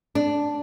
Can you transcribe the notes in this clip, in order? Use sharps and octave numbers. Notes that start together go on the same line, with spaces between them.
D4